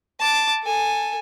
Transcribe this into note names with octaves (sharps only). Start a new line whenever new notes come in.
A5 D6
A4 G#5